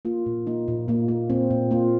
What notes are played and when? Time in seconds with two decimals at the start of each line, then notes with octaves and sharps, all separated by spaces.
0.05 A#3 F4
0.26 A#2
0.47 A#3 D#4
0.68 A#2
0.88 A#2 A#3
1.08 A#3
1.30 A#2 C4
1.50 A#2
1.71 A#3 F4